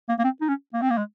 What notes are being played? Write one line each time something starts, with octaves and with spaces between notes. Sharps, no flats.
A#3
A#3
C4
D#4
C#4
A#3
C4
A#3
G#3